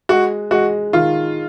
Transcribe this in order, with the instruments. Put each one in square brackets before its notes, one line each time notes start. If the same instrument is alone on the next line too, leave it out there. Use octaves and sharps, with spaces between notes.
[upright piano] G#3 [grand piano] F#4
[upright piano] G#3 [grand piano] F#4
[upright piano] D#3 [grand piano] F4